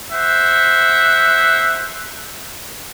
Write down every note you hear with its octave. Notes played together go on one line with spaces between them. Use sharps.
C5 E5 F#5